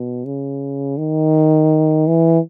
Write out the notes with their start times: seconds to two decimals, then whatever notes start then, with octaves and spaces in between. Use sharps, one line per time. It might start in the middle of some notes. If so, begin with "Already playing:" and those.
Already playing: B2
0.25 C#3
0.98 D#3
2.07 E3